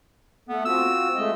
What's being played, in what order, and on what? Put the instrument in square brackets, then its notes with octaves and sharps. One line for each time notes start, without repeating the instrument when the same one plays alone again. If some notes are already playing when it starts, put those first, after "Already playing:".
[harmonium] A3 A4 [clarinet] B3
[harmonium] C4 F4 F#4 [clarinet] E6
[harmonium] G#3 A3 D#5